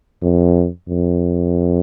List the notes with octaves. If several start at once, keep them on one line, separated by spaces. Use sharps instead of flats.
F2
F2